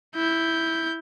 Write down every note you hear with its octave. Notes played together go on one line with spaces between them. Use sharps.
E4 G6